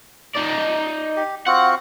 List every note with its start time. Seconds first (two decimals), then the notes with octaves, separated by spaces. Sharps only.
0.36 D#4 D5
1.16 G4
1.47 C4 F4 F#4 F#5